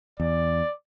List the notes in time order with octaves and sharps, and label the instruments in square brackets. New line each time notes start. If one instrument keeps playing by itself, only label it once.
[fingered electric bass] E2 [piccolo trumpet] D5